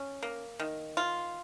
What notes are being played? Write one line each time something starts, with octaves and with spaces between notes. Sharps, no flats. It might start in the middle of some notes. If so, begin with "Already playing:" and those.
Already playing: C#4
A#3
D#3
F4